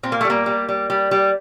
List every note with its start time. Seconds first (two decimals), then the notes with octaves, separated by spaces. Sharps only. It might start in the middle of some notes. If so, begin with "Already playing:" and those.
0.03 A#2 C4
0.12 A#3
0.21 A3
0.25 G3 A#3
0.46 G3
0.69 G3
0.90 G3
1.11 G3